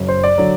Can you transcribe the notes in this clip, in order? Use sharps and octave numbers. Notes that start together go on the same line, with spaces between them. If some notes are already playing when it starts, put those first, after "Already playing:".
Already playing: F#1 F#2 F#3
C5
D5
D3 F#3